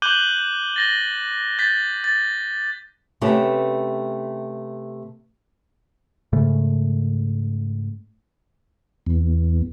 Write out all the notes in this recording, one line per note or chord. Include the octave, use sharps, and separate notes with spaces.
D6 F#6 G6 D#7 F#7 G7
A6 A#6 G7
G6 A6 B6
A6
C3 A3 B3 C#4 G4
G#2 C#3 A3
E2